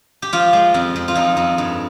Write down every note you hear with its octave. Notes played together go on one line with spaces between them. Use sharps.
G4
F3 F4
G#3
F2
F2
F4
F2 D#4
F2
G2